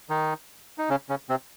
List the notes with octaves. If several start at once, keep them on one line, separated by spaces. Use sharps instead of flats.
D#3 D#4
D#4
C#3 C#4
C#3 C#4
C3 C4